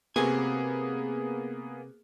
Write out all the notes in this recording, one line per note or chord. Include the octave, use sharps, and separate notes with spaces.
C3 A#3 B3 F#4 G#4 G#5